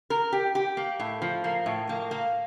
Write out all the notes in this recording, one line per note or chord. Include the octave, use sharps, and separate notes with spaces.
A#4
G4
G4
A#3
A2
F3
A#3
A2
A#3
A#3